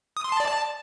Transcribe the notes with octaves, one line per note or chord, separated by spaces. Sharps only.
D#6
C6
A5
D5
A5